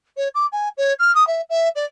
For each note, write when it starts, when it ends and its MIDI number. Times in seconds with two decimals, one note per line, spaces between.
0.17 0.28 73
0.34 0.46 86
0.52 0.68 80
0.77 0.93 73
0.99 1.13 89
1.15 1.26 87
1.27 1.41 76
1.49 1.69 76
1.75 1.84 74